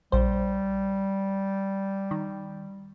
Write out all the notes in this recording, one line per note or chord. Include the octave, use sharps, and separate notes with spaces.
A#1 G3 C5
D#3